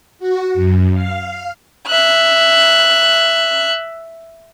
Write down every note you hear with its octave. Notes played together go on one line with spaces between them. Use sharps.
F#4
F#2
F5
E5 F#6